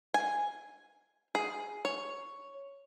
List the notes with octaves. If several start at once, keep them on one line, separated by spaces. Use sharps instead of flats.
G#5
G#4
C#5